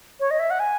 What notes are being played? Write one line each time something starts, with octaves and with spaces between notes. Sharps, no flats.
C#5
D#5
E5
F#5
G#5